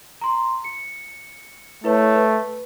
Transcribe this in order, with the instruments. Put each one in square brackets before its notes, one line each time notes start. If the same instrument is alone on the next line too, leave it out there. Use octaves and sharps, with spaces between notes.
[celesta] A#5 C6
C#7
[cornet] A3 [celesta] E4 B4 C#5
[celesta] B4